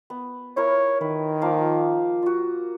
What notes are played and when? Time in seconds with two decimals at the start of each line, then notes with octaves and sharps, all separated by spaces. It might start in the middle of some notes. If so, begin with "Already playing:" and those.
0.10 B3
0.57 E4 A#4 C#5
1.01 D#3 B4
1.41 F3 A#3 F5
2.22 F4 F#4